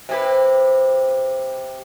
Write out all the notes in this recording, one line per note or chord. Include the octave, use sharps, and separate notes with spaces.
C3 G4 B4